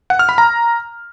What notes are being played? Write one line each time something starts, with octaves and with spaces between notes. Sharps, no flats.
F#5
F6
B5
A#5